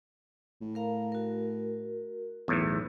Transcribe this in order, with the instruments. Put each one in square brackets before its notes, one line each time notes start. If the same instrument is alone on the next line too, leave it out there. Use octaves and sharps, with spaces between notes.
[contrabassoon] A2
[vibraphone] A#4 F5 A#5
F#4 A#4
[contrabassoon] B1 [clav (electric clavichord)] E2 A2